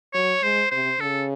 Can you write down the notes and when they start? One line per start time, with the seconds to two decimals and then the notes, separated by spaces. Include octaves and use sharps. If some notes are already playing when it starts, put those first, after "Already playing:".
0.14 F#3 C#5
0.43 G#3 C5
0.71 C3 C5
1.01 C#3 A4